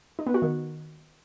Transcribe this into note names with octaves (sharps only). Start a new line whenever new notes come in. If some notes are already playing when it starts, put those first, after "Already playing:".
D#4
B3
F#4
D#3